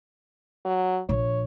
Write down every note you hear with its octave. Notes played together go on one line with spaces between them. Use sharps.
F#3
A#1 C#5